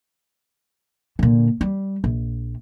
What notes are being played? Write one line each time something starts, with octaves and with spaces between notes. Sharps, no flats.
A#2 D3
G3
A#1